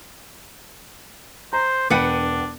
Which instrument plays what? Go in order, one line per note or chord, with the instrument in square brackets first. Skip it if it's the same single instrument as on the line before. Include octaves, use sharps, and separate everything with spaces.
[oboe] C5 [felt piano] A#5
[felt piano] E1 C#7 D#7 [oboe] D4 [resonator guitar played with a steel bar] B4 F#5 G5